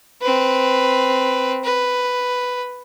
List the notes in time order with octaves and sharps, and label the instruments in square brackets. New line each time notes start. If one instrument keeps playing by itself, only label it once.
[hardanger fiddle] C4 B4
B4